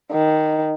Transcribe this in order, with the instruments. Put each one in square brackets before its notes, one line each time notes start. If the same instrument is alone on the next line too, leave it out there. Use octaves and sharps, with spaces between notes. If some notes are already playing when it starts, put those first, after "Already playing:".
[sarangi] D#3